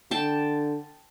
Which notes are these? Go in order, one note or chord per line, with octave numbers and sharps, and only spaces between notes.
D3 G5 A5